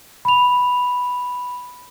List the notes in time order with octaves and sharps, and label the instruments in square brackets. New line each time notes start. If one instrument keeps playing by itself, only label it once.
[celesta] B5 F7